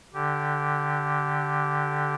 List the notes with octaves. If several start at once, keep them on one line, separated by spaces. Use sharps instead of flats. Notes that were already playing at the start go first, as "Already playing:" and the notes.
D3 G4